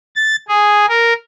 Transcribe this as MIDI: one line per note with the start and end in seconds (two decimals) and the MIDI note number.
0.16 0.36 93
0.49 0.86 68
0.88 1.13 70